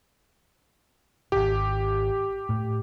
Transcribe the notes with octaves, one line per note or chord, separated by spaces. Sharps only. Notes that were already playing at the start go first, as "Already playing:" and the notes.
D#1 G#1 G4
A2